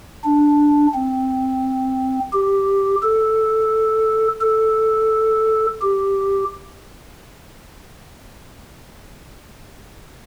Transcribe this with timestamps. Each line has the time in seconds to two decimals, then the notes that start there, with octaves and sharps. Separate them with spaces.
0.24 D4
0.94 C4
2.33 G4
3.03 A4
4.41 A4
5.82 G4